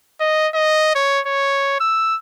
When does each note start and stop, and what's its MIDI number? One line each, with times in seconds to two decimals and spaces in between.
0.20 0.48 75
0.54 0.93 75
0.95 1.20 73
1.27 1.80 73
1.80 2.17 88